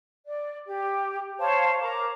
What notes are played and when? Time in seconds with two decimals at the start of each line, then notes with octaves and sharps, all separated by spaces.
0.24 D5
0.65 G4
1.38 C5 C#5 F5 A5
1.80 A#4 A#5 D6